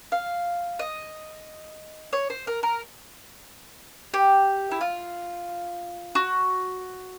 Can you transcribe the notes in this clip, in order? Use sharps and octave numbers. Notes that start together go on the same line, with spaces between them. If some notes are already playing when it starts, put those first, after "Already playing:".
F5
D#5
C#5
C5
A#4
A#4
G4
E4
F4
F#4